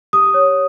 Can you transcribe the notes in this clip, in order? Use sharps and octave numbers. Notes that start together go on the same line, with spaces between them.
G4 D#6
C#5